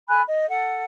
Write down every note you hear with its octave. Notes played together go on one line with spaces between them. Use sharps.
A4 G#5 B5 F#6
D#5
A4 F#5